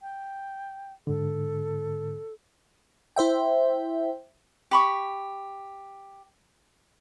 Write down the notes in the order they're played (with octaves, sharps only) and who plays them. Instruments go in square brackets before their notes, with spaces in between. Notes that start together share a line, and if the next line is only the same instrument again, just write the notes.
[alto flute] G5
[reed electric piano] G#2 D3 [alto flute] A4
[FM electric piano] E4 C5 E5 G5
[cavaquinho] G4 B5 C#6